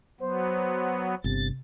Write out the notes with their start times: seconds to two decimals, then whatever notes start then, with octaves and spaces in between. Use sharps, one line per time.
0.20 F#3 B3 C5
1.24 G1 C3 A6